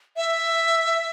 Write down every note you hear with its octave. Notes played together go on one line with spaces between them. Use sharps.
E5